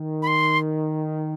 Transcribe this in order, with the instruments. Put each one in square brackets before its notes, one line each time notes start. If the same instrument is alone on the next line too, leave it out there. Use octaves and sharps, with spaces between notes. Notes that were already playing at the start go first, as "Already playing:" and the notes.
Already playing: [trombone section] D#3
[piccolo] B5
C6